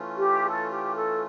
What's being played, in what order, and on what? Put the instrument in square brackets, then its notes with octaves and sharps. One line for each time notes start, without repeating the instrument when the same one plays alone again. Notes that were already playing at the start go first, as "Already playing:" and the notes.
Already playing: [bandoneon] E3 A3 C#4 F4
[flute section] G4
A4
G4
A4